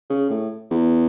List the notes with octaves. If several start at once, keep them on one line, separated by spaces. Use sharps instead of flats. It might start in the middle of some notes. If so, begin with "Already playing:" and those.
C#3
A2
E2